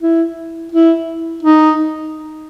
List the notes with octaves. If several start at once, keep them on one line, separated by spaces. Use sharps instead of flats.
E4
E4
D#4